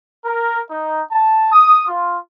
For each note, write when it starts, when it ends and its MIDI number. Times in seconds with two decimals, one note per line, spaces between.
0.25 0.60 70
0.71 1.02 63
1.11 1.49 81
1.52 1.88 87
1.88 2.17 65